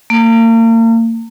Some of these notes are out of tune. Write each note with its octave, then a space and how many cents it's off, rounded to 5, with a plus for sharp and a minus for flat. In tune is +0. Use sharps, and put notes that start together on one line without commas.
A#3 -40